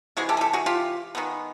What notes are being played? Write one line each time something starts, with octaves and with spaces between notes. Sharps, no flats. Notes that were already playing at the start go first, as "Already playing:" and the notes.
C3 E3 G#3 F#4 G#4
G4 A4
G#4
G4 A4
F#4 G#4
F4 G4
D#3 G#3 B3